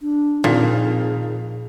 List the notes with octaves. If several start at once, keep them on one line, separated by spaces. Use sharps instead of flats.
D4
F2 A#2 D#3 G#4 F5